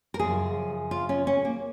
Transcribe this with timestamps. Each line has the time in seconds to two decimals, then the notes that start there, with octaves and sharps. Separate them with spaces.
0.14 A#4
0.19 F#2 C#3 F3 G#4
0.91 F4
1.09 C#4
1.27 C#4
1.45 A#3